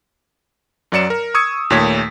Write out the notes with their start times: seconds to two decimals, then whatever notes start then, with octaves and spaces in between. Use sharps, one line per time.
0.92 F#2 F#3 D5 C#7 E7
1.10 A#4
1.34 C#6 D#6 E6 G#6 C#7
1.70 D#2 A#2 A3 C#5 G#6 B6